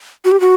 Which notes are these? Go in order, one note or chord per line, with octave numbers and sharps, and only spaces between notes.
F#4
G4
F#4